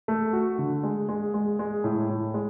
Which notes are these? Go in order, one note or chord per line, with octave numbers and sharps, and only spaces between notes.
A3
F#4
D3
G#3
G#3
G#3
G#3
A2
A2
G#3